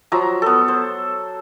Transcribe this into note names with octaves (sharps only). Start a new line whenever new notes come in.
F3 F#3 A#5
B3 A4
C5